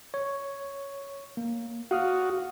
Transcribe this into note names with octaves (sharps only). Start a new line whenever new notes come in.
C#5
A#3
F#4 F5 D#6 F6